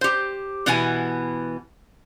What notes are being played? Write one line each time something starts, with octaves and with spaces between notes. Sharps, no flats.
G4 C5
B2 E3 B3 E4 G#5